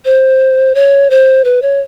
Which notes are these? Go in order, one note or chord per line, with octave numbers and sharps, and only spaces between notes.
C5
C#5
C5
B4
C#5